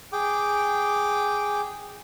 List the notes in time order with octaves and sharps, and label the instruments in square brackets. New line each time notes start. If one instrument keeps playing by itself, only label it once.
[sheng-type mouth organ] G#4 G5 D6